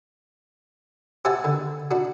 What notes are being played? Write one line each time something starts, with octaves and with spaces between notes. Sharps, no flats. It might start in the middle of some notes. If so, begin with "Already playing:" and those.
G4 C5 E5 F#5 G#5 A5
D3
D4 F#4